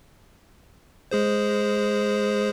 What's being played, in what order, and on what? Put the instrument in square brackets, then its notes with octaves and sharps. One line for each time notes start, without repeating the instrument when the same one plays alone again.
[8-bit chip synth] G#3 G#4 C5